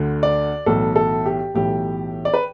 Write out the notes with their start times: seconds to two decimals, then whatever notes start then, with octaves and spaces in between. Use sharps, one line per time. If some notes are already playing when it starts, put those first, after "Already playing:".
Already playing: D2 D3
0.23 D5
0.66 B1 A2 E3 A4
0.96 A4
1.26 G4
1.54 B1 A2 E3 G4
2.25 D5
2.34 B4